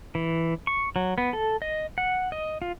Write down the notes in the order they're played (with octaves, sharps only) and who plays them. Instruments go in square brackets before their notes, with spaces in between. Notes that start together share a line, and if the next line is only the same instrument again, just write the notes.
[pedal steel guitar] E3
C#6
F#3
B3
A4
D#5
F#5
D#5
F4